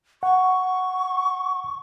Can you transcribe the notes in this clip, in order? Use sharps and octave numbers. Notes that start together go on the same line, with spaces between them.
F#5 C#6